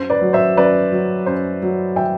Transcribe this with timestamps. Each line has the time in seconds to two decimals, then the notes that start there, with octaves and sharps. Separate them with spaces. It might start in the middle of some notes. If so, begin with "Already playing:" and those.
Already playing: F#2 C5
0.10 B4 D5
0.21 F#3
0.33 C5 E5
0.56 F#2 B4 D5
0.92 F#3
1.26 F#2 C5
1.63 F#3
1.96 E5 G5